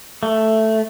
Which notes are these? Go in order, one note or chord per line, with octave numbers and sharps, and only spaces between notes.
A3